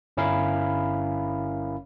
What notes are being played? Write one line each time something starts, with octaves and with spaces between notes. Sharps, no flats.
G1 C#4 E4 A#4 F5 B5